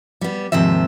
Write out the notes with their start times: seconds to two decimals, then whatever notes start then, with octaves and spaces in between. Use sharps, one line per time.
0.21 G3 B3
0.52 D#2 G#2 C3 F3 E5